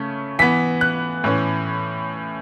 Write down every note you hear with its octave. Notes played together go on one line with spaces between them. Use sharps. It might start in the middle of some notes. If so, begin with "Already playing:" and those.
Already playing: C#3 A3 C#4
E3 B3 B6
F#6
A2 E3 C#4